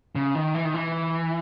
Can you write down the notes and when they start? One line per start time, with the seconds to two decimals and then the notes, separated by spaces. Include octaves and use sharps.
0.15 C#3
0.35 D#3
0.55 E3
0.65 D#3
0.74 E3